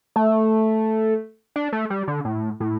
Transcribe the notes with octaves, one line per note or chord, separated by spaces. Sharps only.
A3
D4
A3
G3
D3
A2
A2